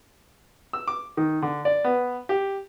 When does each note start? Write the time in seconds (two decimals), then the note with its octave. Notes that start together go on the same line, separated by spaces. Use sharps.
0.73 E6
0.88 D6
1.17 D#3
1.42 D3
1.65 D5
1.84 B3
2.29 G4